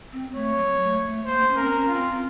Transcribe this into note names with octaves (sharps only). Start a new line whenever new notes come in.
C4
A3 C#5
F#3
A3
A3
A#3 C5
C#4
A#4
C4
C#4
F4
C4